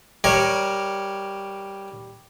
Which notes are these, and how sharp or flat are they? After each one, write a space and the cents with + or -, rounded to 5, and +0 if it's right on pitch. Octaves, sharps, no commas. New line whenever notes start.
G3 +0 A#4 +10 C#5 -5